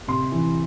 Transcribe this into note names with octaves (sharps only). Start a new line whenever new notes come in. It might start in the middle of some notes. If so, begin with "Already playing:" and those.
C3 C6
E3